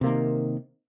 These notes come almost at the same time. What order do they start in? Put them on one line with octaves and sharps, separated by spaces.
C3 A#3 D#3